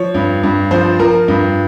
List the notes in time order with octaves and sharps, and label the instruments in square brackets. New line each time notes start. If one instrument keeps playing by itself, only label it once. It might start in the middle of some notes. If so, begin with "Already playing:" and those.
Already playing: [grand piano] F3 C#5
G2
G2
F3 C5
F3 A#4
G2